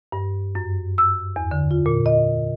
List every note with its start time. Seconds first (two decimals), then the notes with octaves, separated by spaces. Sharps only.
0.12 G2
0.55 F#2
0.98 E6
1.36 E2
1.51 D3
1.71 F4
1.86 A#2
2.06 D#5